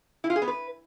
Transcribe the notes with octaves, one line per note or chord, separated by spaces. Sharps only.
E4
F4
G#4
B3
B4